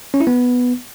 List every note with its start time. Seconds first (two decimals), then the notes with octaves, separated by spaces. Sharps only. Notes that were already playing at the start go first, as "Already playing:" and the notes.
0.14 C#4
0.20 E4
0.27 B3